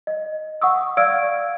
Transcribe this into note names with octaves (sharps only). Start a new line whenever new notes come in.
D#5
F#5 C#6 D#6 E6
D5 F5 E6 F6 G#6 D7